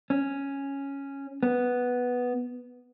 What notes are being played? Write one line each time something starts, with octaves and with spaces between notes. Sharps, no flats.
C#4
B3